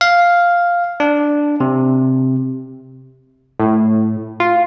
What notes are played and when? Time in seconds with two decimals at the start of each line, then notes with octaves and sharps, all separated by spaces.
0.01 F5
1.00 D4
1.60 C3
3.60 A2
4.40 F4